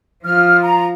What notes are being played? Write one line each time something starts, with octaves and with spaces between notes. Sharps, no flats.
F3 F4 F6
A#5